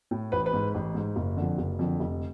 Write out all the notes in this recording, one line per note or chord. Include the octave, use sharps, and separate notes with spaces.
A2
A1 B4
B4
G#2
A1
G#2
F#1
F2 D3
F#1
F2 D3
F1